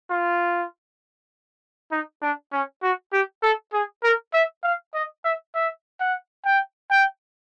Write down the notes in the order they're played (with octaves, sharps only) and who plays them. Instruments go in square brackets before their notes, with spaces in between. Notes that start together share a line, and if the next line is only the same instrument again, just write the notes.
[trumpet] F4
D#4
D4
C#4
F#4
G4
A4
G#4
A#4
E5
F5
D#5
E5
E5
F#5
G5
G5